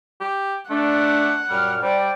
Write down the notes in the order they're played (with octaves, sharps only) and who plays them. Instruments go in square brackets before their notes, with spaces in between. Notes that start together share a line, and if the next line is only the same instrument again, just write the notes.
[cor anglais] G4
[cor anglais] A3 [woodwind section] D4 [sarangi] F#5
[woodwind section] F#2 A#2 F6 [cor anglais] G3
[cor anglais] G3 [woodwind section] C5 G5 [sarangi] D5